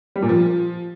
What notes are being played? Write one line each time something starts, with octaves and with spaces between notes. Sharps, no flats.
G3
A#2
F3